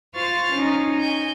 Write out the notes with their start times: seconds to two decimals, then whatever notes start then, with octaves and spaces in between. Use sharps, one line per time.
0.15 F4 C5 C#6 F6 A6
0.53 C#4 D#4
1.00 G#5 G6